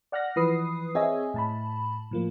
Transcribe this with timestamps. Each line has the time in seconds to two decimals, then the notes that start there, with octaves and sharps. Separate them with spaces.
0.12 D5 F#5 F6 F#6 A#6
0.36 E3 F3 B4 D#6 C7
0.95 C4 G#4 C#5 D#5 E5 G#5
1.34 A2 A5 B5
2.11 A2 F3 A#3